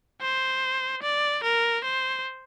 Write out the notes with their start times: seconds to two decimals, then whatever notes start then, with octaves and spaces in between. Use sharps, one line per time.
0.21 C5
1.03 D5
1.44 A#4
1.85 C5